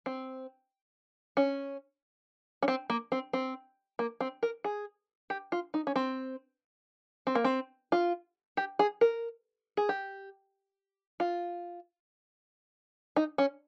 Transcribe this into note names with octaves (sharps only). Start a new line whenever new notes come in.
C4
C#4
C#4
C4
A#3
C4
C4
A#3
C4
A#4
G#4
G4
F4
D#4
C#4
C4
C4
A#3
C4
F4
G4
G#4
A#4
G#4
G4
F4
D#4
C#4